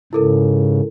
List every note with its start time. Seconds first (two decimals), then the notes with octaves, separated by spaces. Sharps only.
0.13 G#2 C#3 E4 A4 A#4